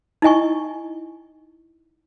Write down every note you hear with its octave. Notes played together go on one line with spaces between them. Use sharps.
D#4 E4 D#5 G#5 C#6